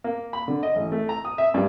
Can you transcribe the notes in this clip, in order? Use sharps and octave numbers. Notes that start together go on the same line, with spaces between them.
A#3
B5
D3
D#5
A1
A3
A#5
D#6
E5
G2